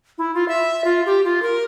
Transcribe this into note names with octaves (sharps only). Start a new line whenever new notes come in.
E4
F4
E5
F4
G4
F4
A#4